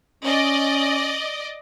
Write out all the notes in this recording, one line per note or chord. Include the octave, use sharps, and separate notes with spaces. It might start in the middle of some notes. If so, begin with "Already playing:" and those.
C#4 D5 D#5